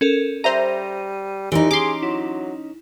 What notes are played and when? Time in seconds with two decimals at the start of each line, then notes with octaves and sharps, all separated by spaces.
0.01 C#4 A4 A#4
0.44 G3 C5 E5 A#5 D#7
1.52 A#2 E3 F3 D#4 G4
1.71 C#4 D#4 G#4 C6 D6
2.03 F#3 E4